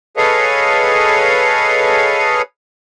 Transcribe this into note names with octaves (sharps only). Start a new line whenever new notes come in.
G#4 A4 B4 C#5 D#5 F5